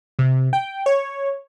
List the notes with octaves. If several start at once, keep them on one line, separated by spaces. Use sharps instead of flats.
C3
G5
C#5